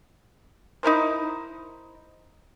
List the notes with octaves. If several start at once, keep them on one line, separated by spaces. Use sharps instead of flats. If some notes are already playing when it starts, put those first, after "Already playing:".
D#4 E4 A#4 C5